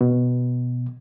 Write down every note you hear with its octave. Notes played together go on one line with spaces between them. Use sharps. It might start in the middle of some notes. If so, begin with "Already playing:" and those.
B2